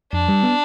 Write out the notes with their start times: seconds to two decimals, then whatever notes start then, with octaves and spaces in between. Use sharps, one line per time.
0.13 F2 D4
0.29 G3
0.43 B3